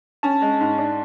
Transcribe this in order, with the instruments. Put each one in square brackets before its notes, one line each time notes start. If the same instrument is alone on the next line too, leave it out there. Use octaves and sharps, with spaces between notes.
[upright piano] C#4 [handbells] A5
[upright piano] G#3
G#2
D4